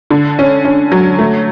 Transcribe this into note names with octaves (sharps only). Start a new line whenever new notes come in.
D3
C#4
C#4
F#3
A3